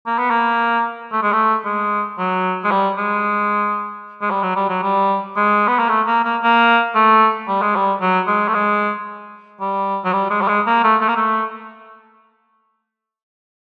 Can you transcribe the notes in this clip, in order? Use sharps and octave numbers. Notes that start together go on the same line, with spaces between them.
A#3
B3
A#3
A3
G#3
A3
G#3
F#3
G#3
G3
G#3
G#3
G3
F#3
G3
F#3
G3
G#3
B3
A#3
A3
A#3
A#3
A#3
A3
G3
G#3
G3
F#3
G#3
A3
G#3
G3
F#3
G3
G#3
G3
G#3
A#3
A3
A3
A#3
A3